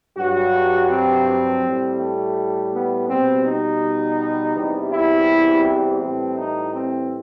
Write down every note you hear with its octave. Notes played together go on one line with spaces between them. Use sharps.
G2 F#3 F#4
C4
A2 G3
A3
B3
B2 G3 C4
D#4
E2 C3 E3 G3
E4
C4
A2 E3 G3
D#4
C4